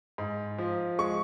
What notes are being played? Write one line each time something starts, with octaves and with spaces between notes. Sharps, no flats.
G#2
F3
G#3 C#6